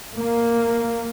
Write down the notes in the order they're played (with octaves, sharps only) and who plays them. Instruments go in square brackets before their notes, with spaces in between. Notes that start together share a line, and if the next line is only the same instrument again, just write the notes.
[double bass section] A#3